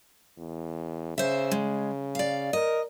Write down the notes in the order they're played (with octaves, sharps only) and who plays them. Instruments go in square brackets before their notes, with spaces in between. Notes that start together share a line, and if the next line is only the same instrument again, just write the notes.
[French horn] E2
[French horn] C#3 [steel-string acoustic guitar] C5 E5
[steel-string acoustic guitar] G#3
D5 F5
[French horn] A#4 [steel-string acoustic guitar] D#5